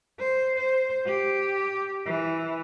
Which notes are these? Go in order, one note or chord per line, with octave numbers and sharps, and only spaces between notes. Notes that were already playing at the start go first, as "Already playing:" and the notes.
C5
C5
G4
E3